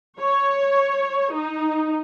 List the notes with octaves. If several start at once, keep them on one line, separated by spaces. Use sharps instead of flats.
C#5
D#4